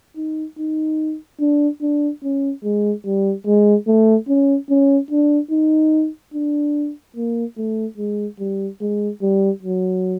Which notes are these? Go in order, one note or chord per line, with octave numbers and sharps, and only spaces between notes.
D#4
D#4
D4
D4
C#4
G#3
G3
G#3
A3
C#4
C#4
D4
D#4
D4
A#3
A3
G#3
G3
G#3
G3
F#3